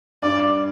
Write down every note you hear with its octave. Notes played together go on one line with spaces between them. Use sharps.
G2 D5